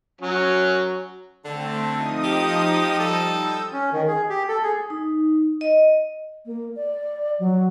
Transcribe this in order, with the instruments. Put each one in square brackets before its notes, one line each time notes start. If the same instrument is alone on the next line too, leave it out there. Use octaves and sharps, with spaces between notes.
[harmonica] F#3 C#4
[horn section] D3 [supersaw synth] A3 C4
[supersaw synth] F3 D#4 D#6
[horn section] G4
G3 A4
[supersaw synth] E6 G6
[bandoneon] C#4
D#3
G#4
G4
A4
G#4
[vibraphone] D#4
D#5
[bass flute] A#3
D5
F#3